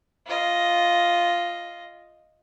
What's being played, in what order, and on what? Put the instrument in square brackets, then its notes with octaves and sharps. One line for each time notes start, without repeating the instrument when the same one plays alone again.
[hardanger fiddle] F4 D#5